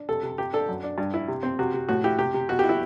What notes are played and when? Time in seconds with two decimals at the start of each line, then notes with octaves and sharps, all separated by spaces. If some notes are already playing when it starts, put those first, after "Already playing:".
Already playing: D4
0.09 C3 A4
0.23 C3
0.38 C3 G4
0.53 D4 A4
0.69 F#2
0.83 D4
0.98 G2
1.14 E4
1.28 C3
1.43 C4
1.59 C3 F#4
1.74 C3
1.89 A2 F#4
2.04 E4 G4
2.19 C3 G4
2.34 C3
2.49 B2 F#4
2.59 E4 G4
2.69 E4